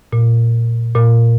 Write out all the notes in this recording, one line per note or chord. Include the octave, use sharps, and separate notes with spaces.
A#2
A#2